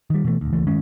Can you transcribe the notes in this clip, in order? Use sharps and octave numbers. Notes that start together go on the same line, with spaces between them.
D#3 G3
B2 E3 G#3 A3
D#1 D2
E1 C#2 E3 A3
G2 D#3 G#3 C#4